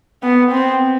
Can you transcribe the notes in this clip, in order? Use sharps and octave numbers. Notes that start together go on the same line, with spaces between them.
B3
C4